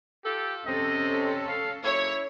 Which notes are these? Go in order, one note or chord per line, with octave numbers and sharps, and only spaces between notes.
F4 G4 A4
C3 C4 C#4 A4 D#5
F5
F#2 A#2 A#3 E4 C#5